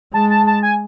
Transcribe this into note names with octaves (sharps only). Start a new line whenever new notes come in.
G#3 A5
A5
A5
G#5